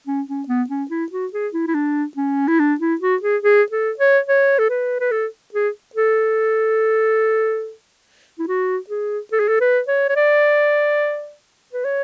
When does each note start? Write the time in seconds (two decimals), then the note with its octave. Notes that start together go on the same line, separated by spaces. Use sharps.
0.07 C#4
0.28 C#4
0.48 B3
0.70 C#4
0.91 E4
1.12 F#4
1.33 G#4
1.54 E4
1.68 E4
1.75 D4
2.17 C#4
2.48 E4
2.60 D4
2.80 E4
3.01 F#4
3.23 G#4
3.43 G#4
3.72 A4
3.99 C#5
4.28 C#5
4.59 A4
4.70 B4
5.00 B4
5.12 A4
5.54 G#4
5.95 A4
8.39 E4
8.48 F#4
8.90 G#4
9.33 A4
9.40 G#4
9.48 A4
9.61 B4
9.88 C#5
10.09 C#5
10.16 D5
11.73 B4
11.85 C#5